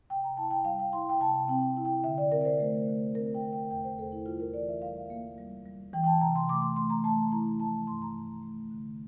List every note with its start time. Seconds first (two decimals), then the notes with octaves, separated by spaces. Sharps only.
0.09 C3 G5
0.24 A#5
0.37 E4 A5
0.51 G5
0.65 G3 F5
0.79 G5
0.93 E4 C6
1.09 G5
1.21 C3 A5
1.48 C4 G5
1.77 E4
1.85 G5
2.04 D3 E5
2.18 D5
2.32 C4 A#4
2.41 D5
2.45 C5
2.60 A3
2.88 D3
3.15 C4 A#4
3.34 G5
3.43 D3
3.52 G5
3.70 E2 G5
3.85 C5
3.98 A3 A4
4.12 E4
4.26 G3 F4
4.40 A#4
4.54 E3 D5
4.69 E5
4.82 G3 F5
5.10 A#3
5.38 G3
5.66 G3
5.94 E3 G5
6.04 G5
6.06 A5
6.21 C3 A#5
6.35 C6
6.49 A3 D6
6.62 C6
6.76 A3 C6
6.90 A#5
7.04 A3 A5
7.32 E4 A#5
7.60 F3 A5
7.87 G2 C6
8.02 A#5
8.15 G2
8.43 A3
8.71 D3